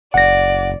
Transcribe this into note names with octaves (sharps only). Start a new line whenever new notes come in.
F#1 D5 F#5 A#6